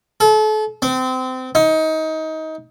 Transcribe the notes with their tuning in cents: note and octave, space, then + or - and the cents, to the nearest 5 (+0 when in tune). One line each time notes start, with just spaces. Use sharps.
A4 -35
C4 -25
D#4 +25